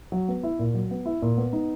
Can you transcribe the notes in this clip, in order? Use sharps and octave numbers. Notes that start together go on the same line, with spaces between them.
F#3
B3
E4
A#2
F#3
B3
E4
A#2
B3
D#4